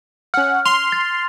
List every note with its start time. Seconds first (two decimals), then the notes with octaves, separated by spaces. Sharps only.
0.34 C#4 F#5 F6
0.65 C6 F7
0.92 A6